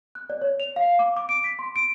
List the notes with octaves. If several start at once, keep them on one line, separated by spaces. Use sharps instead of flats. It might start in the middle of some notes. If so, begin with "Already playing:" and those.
F#6
D5
C#5
F7
F5
D6
D6
D7
B6
C6
D7